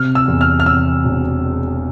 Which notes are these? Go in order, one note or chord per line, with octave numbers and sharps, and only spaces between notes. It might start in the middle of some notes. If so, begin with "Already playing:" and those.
Already playing: C3 F6
E6
E2
F6
F6
C3 E6
E1